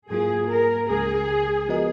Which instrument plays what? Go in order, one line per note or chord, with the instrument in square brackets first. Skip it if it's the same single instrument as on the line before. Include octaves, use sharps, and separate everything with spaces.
[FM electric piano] G#2 F#3 A#3 F4 [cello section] G#4
[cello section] A#4
[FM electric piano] C#2 C#3 G#3 [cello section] G#4
[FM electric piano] F3 B3 F#4 A#4 D#5